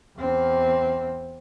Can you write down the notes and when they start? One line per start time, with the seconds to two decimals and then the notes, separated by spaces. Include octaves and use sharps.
0.18 E2 C4